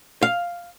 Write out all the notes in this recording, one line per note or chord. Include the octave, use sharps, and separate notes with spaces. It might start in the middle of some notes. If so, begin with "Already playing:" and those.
F5